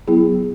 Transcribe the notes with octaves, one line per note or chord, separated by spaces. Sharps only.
F#3 B3 E4 G#4